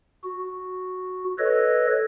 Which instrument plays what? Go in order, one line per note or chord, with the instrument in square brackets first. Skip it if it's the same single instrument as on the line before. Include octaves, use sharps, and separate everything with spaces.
[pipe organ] F#4
A4 B4 C#5 D#5